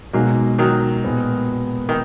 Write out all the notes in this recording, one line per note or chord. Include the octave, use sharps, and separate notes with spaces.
B2 F#3 G#3 A#3 D#4
D#3 F#3
A#2 G#3 B3
D#3